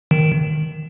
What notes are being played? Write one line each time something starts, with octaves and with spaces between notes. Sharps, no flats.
D#3